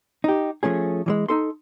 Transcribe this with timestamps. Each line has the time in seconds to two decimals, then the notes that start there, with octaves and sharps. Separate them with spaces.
0.24 D#4 G4
0.63 F3 A3 C#4 G#4
1.06 E3 F3 G#3
1.28 D#4 A4 C6